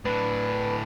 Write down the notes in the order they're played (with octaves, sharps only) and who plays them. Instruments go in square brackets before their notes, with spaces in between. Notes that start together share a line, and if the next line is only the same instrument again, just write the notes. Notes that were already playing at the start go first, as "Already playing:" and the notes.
[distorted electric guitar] A2 D4 [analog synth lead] B4